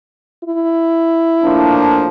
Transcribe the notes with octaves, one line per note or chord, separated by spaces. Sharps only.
E4
A2 F3 A#3 D4